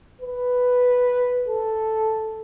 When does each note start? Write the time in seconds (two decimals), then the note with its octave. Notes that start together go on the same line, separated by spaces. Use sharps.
0.22 B4
1.48 A4